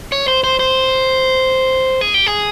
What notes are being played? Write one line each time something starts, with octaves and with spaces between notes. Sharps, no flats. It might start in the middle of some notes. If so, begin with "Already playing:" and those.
C#5
C5
C5
C5
G#4
G4
G#4